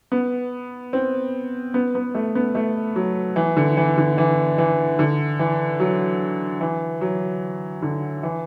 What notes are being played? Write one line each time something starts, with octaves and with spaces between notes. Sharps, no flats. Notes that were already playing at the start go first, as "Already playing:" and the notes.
B3
C4
B3
B3
A3
B3
A3
F#3
E3
D3
E3
D3
E3
E3
D3
E3
F#3
E3
F#3
D3
E3